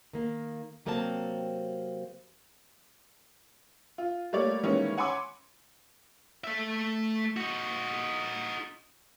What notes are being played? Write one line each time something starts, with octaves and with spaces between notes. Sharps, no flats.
D#3 A#3
C3 F#3 A#3 C4 D5 A5
F4
G3 A3 A#3 C#5 D5
D#3 E3 G3 G#3 A#3 C#4
C#5 F#5 G#5 B5 C6 D6
A3 E5
D#4 F#4